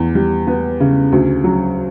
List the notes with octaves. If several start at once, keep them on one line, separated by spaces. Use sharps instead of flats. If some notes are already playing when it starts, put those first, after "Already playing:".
Already playing: E2
G3
B3
C#3
D2
F#3